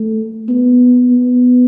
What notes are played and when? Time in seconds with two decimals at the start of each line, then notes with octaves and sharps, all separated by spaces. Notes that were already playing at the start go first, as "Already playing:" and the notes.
Already playing: A3
0.49 B3
1.11 B3